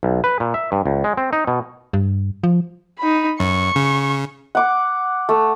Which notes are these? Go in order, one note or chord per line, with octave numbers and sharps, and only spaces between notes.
B1
B4
A#2
E5
G2
C#2
G#3
C4
D#4
B2
G2
F3
D#4 B5
F#2 C#6
C#3
F#5 D6
A3